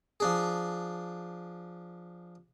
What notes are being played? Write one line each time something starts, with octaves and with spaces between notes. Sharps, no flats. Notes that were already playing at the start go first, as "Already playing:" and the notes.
F3 D4 G#4